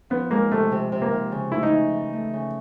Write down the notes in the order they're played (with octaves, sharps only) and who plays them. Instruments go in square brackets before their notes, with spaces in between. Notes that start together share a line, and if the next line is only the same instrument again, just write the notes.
[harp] F3 [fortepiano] B3
[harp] G#3 [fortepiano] A#3
[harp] C3 [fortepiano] A3
[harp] C3
C3
[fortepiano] A#3
[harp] C3
C#3
[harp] A3 [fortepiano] E4
[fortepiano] D#4
[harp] C#3
E3
A3
C#3